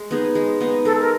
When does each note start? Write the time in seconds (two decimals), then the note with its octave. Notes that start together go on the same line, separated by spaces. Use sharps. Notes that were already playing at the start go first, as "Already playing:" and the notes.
Already playing: G#3
0.11 B3 D#4 G#4
0.35 G#3
0.61 B3 D#4 G#4
0.85 G#3 A4
1.00 A#4